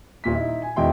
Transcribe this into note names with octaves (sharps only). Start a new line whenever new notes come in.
D#1 A#2 B6
D#4 E4
G#5
E1 B2 D#3 E4 G5 C6